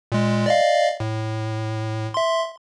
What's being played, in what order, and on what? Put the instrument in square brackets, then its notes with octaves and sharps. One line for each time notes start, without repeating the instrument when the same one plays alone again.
[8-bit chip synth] A#2 G#3
D5 D#5 F5
A2
E5 C6